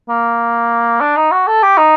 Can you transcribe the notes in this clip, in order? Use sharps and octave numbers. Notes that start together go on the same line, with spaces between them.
A#3
D4
D#4
F#4
A4
G4
D#4